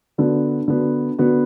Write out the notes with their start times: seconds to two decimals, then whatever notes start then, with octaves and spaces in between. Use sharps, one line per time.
0.18 D3 B3 F#4
0.68 D3 B3 F#4
1.19 D3 B3 F#4